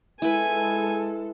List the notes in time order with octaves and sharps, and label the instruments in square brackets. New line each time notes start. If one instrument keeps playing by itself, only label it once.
[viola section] G#3 A4 [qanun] E4 B4 [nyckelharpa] G#5